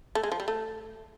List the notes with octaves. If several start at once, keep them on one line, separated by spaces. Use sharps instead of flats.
A3
G#3
F3
G3
A3